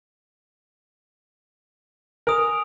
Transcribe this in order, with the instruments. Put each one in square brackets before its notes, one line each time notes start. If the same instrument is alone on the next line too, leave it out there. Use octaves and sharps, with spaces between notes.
[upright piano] A#4 [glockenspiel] G#5 D#6 F7